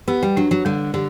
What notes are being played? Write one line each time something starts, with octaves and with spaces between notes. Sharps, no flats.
B3 G4
G3
F#3 D4
F#3
D3 G3
D3 G4